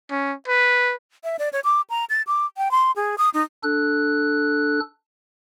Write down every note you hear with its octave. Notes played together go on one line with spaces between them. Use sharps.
C#4
B4
E5
D5
C#5
D6
A#5
A6
D6
G5
C6
G#4
D#6
D#4
D4 A4 F#6